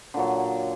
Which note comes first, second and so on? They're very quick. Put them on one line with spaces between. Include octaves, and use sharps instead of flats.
D3 A#2 F#3